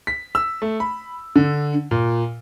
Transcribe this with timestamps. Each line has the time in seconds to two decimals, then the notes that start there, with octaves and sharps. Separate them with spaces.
0.07 B6
0.35 E6
0.62 A3
0.80 B5
1.36 D3
1.91 A#2